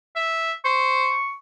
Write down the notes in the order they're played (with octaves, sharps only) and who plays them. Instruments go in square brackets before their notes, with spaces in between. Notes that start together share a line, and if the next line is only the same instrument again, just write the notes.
[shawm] E5
[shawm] C5 [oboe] C#6